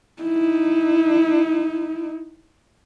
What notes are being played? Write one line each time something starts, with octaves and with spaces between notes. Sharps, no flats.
D#4 E4